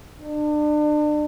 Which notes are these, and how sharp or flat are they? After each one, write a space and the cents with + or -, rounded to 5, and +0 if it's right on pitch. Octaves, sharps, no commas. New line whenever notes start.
D4 +35